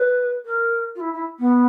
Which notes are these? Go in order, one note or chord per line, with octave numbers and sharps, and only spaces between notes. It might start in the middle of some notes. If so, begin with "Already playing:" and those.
Already playing: B4
A#4
F4
E4
E4
B3